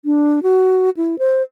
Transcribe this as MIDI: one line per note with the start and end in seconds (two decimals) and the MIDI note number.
0.05 0.40 62
0.43 0.90 66
0.97 1.19 64
1.19 1.42 72